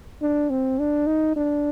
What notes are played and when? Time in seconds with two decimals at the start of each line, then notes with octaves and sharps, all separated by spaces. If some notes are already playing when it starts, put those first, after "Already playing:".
0.22 D4
0.50 C4
0.79 D4
1.07 D#4
1.36 D4